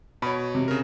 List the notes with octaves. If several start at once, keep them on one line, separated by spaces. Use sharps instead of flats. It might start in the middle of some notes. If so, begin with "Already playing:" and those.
B2 C#5 B5
C3
C#3 A#4